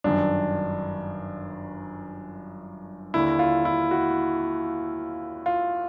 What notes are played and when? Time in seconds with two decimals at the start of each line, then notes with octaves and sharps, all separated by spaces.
0.04 G1 F#2 D#3 D4
3.14 D#2 D3 E4
3.39 F4
3.65 E4
3.91 F#4
5.46 F4